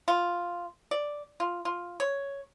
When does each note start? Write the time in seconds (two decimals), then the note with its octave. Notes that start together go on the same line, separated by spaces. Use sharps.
0.08 F4
0.91 D5
1.40 F4
1.65 F4
2.00 C#5